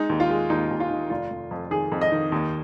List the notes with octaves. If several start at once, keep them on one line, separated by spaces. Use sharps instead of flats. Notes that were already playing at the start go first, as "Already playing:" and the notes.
Already playing: G#3 D#4
D#2
F4
G#3
D#2 D#4
D#2
F4
D#3
F1 F4
F1
F2
D#3 G#4
F2
D#5
D#3
D#2